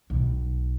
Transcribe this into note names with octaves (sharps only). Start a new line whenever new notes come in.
B1